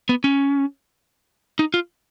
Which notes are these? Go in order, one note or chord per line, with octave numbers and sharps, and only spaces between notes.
B3
C#4
D#4
F4